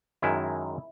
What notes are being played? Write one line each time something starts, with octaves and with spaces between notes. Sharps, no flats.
F#2 D#3 G#3 E4